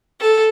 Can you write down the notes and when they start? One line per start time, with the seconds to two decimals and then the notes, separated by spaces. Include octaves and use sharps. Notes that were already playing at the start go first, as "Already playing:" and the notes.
0.20 A4